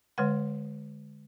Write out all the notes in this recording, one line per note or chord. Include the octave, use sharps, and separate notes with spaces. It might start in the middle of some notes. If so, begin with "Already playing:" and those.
D3 G#3 B4 F#5